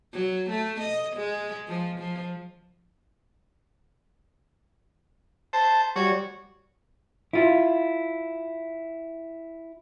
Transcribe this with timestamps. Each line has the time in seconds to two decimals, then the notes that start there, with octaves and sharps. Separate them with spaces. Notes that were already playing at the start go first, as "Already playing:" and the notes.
0.13 F#3
0.50 A3
0.80 D#5
1.16 G#3
1.68 F3
1.99 F3
5.53 C5 A5
5.96 G3 F#4 C#5
7.33 E4 F4